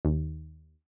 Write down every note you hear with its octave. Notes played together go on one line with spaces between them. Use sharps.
D#2